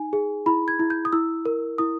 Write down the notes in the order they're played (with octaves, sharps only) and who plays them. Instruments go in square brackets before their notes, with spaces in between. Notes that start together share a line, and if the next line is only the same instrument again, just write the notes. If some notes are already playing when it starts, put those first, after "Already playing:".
Already playing: [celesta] D#4 G#5
G#4
E4 B5
G#6
E4
G6
D#6
E4 E6
A#4
E4 D#6